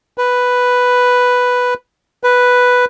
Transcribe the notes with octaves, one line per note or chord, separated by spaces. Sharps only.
B4
B4